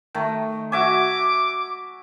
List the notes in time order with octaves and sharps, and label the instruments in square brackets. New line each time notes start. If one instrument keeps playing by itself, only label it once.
[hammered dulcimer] D#3 A3
[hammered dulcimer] F#4 E5 G#5 [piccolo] D6